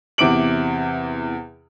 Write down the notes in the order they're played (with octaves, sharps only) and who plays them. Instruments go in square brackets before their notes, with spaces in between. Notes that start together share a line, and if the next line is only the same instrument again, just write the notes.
[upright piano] E2 C3 D6 D7 F#7